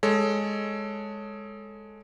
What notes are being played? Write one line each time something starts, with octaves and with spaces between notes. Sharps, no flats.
G#3 A4 C#5